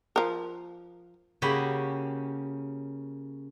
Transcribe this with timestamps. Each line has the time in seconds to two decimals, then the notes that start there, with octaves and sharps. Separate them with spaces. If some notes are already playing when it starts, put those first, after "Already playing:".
0.16 F3 A#4
1.42 C#3 A#3 C#4 F#4 G4 B5